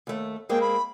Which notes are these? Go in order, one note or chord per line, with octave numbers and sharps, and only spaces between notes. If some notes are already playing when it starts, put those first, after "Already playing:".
D#2 A3
G#3 A#3 C4 G5
B5